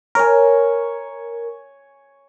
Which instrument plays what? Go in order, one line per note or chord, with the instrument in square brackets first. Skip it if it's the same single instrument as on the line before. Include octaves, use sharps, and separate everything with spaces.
[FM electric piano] A#4 [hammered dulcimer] C#5 G#5